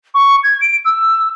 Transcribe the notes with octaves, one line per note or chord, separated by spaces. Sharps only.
C#6
G#6
D7
E6